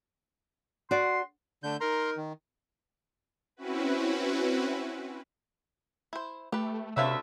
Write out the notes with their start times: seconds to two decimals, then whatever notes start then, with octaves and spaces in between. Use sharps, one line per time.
0.91 F#4 D5 C6
1.63 D3 A3 D4 G6
1.81 D#4 A#4 A#5 C6
2.17 D#3
3.57 C4 C#4 E4 F#4 B4
6.13 E4 C5
6.52 A3 G4 B4
6.97 D2 C3 C#4 B4 E5 F5